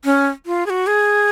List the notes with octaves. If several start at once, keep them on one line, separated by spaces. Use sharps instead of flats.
C#4
F4
G#4
F#4
G#4